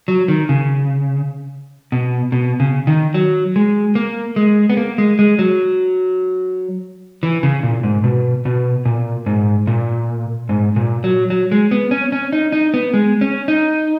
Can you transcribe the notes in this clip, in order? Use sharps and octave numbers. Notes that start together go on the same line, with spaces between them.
F#3
D#3
C#3
B2
B2
C#3
D#3
F#3
G#3
A#3
G#3
B3
A#3
G#3
G#3
F#3
E3
C#3
A#2
G#2
B2
B2
A#2
G#2
A#2
G#2
A#2
F#3
F#3
G#3
B3
C#4
C#4
D#4
D#4
B3
G#3
C#4
D#4